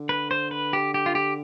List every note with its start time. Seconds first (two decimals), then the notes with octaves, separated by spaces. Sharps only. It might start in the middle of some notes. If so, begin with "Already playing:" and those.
Already playing: D3
0.09 B4
0.31 C5
0.51 B4
0.73 G4
0.94 G4
1.06 F4
1.15 G4